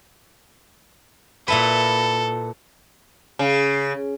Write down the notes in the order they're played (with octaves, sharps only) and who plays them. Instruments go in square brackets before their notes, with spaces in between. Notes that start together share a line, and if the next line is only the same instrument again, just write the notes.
[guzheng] A#2 E4 B4 [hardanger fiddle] A4
[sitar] C#3